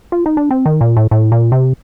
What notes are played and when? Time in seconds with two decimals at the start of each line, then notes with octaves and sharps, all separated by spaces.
0.12 F4
0.26 D#4
0.37 D4
0.51 C4
0.66 D#3
0.81 A#2
0.97 A2
1.11 A2
1.32 A#2
1.52 C3